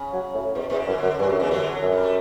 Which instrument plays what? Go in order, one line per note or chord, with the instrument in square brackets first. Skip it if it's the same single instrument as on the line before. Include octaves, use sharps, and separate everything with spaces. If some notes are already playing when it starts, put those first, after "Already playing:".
Already playing: [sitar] C#3
[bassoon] F#3
A2
[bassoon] E2 [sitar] B2
[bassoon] E2 [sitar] B2
[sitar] C#3
[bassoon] F#2 [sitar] E3
[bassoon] F#2 [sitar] D3
[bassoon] G2 [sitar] E3
[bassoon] F#2 [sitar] F#3
[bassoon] E2 [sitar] C#3 E3
[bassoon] F#2 [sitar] D3 F#3
[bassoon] F#2
[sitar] G3
A3